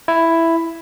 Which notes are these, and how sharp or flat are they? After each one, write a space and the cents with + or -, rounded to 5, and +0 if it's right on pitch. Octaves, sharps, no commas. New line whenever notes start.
E4 +5